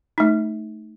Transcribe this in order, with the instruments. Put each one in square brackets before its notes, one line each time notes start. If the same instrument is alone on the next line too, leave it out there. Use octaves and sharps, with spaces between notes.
[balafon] A3 D#4